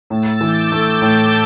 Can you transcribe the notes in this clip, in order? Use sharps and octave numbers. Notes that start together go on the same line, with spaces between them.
A2 E6 A6
E3 D6 G6
A3 D6 G6
A2 A5 D6